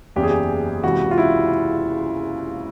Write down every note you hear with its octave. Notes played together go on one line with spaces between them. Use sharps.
F#1 E2 C#3 G4
G#4
G4
C#2 C3 E3 F#4
F4
E4